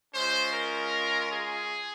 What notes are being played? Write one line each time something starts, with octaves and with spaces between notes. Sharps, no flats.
G#3 C#4 F4 C5
A#4
G#4